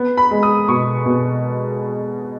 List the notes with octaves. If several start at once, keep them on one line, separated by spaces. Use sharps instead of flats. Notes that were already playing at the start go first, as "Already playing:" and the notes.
Already playing: B3
B5
G#3
D#6
B2 C#6
B2